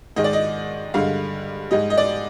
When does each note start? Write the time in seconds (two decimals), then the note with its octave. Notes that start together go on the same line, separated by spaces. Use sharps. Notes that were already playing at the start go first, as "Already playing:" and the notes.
0.16 G#2 D#3 G#3 D#5
0.24 D5
0.33 D#5
0.94 G2 D3 G#3 F5
1.71 G#2 G3 D#5
1.90 D#5
1.97 D5